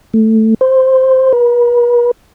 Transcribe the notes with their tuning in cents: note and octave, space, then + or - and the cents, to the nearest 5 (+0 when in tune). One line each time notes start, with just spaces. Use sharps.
A3 +5
C5 +0
B4 -45